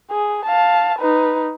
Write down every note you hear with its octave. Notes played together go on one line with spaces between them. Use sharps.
G#4
F5 A5
D#4 B4